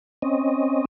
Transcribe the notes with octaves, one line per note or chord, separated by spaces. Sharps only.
C4 C#4 D#5